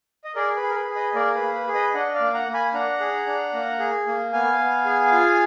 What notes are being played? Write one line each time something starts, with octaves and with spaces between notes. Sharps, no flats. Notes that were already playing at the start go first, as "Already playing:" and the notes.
D#5
G#4 A#4 D5
B4
G#4
A#4
B4
G#4
B4 D#5
A#3 A#4 D5
B4
A#3
B4
G#4
B4 D#5
D4 D#5 F#5
D5 F5
A#3
F#5 A#5
A#3
G#5 B5
D4 F#5 A#5
G#4
D4
A#3
G#4
A#3
B3 F5 G#5
B3
G#4
F4